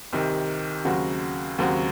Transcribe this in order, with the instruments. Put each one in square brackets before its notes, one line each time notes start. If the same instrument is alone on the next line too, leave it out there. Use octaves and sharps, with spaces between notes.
[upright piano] C2 C3 D#3
D#2 C#3 F#3 C4 F#4
D#2 C#3 F#3 C4 F#4